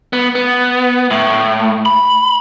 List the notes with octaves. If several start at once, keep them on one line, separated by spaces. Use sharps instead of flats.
B3
B3
A2
B5